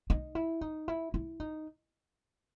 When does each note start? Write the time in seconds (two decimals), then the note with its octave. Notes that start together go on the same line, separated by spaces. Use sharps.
0.10 D#4
0.35 E4
0.61 D#4
0.88 E4
1.14 E4
1.40 D#4